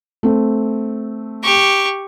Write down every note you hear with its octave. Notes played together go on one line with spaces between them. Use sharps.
A3 C4
G4 C#6